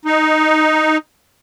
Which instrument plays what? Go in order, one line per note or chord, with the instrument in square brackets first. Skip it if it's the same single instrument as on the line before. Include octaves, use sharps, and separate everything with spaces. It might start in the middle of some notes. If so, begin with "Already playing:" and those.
[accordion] D#4